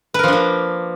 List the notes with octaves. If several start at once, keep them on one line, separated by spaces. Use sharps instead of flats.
F3 A#3 D4 A#4 B4